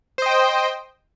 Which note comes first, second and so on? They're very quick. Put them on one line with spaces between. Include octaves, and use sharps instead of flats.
C5 D#5 G5